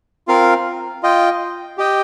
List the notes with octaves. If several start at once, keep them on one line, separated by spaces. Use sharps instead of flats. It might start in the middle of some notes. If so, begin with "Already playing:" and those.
C4 F4 A#4 F5
F4 D#5 G5
G4 D#5 G5